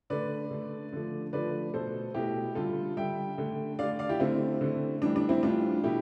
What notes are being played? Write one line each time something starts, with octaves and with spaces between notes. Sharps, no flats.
D3 A3 B4 D5
D3 A3
D3 F3 A3
D3 F3 A3 B4 D5
B2 A3 A4 C5
B2 A3 E4 G4
D3 G3 F4 A4
D3 G3 E5 G5
D3 A3
D3 A3 D5 F5
D5 F5
E4 G4
D3 A3 C4 E4
D3 A3
A2 E3 G3 D4
D4
C4 E4
A2 E3 G3 D4 F4
B2 A3 E4 G4